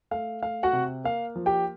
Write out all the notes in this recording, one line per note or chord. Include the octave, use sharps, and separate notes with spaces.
A3 F5
A3 F5
F#4 F#5
C3
A#3 F5
F3
G4 G5